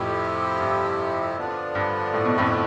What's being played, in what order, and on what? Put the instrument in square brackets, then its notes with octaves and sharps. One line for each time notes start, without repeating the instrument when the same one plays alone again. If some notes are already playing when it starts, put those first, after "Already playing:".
Already playing: [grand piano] F2 A2 [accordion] C3 F3 C4 E4 G4
[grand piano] G2
[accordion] D3 F3 B3 D4
[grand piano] G2
A2
B2
F2 A2